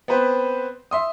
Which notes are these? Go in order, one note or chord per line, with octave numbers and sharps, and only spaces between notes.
B3 C4 B4 C5
E5 C6 D#6